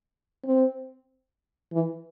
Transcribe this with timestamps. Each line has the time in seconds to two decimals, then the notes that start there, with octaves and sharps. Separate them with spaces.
0.45 C4
1.72 E3